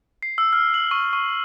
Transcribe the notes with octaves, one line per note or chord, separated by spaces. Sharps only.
C7
E6
F6
F#7
C#6
C#6